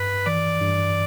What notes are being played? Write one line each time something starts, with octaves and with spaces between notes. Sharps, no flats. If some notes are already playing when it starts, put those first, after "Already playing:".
Already playing: G2 B4
E3 D5
G2